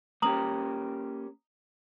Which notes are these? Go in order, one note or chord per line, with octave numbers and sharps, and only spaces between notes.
A#3 C#4 G4 A#5 D#6 F#7